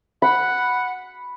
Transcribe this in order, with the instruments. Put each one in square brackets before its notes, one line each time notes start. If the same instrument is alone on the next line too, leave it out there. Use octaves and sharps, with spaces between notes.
[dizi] F#5 [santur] B5